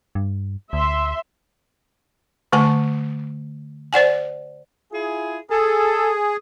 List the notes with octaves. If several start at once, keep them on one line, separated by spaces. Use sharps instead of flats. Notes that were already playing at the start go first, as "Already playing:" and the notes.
G2
D2 E5 C6
D3 A3 G#5 A5
C5 D5 F#5 G#5
E4 F4 G#4
G#4 A4